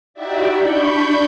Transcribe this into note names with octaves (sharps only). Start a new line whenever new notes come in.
D#4 E4 F#4 G4 D5 E5
D4 B5 C#6 G6